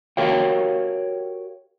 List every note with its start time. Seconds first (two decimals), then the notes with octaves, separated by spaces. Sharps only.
0.17 F#4 G4 A#4 C#5 F5 G5